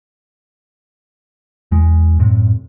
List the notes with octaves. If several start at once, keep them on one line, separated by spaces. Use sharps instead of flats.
E2 G#3
F#2 A2 C3